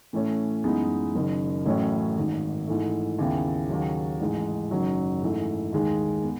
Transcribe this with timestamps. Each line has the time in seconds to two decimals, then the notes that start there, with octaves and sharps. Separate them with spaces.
0.13 A2 E3 A3 C#4
0.64 F#2 E3 G#3 B3 D#4
1.15 F#1 F#2 D#3
1.66 A1 A2 F#3 C#4 E4
2.17 G#1 G#2 D#3
2.67 G#2 E3 A3
3.19 D#2 C#3 E3 B3 E4
3.69 D#2 C#3 F#3
4.20 A1 G#2 E3 G#3 D#4
4.71 F#1 F#2 D#3 F#3
5.22 G#2 E3 A3
5.73 D#2 D#3 G#3 D#4
6.23 B3